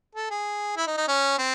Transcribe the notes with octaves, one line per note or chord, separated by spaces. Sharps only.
A4
G#4
E4
D#4
D#4
C#4
C4